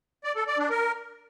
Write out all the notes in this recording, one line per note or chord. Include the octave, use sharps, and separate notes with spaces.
D5
A4
D5
D4
A#4